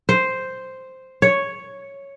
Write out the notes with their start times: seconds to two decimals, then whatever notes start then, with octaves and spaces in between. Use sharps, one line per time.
0.09 C5
1.22 C#5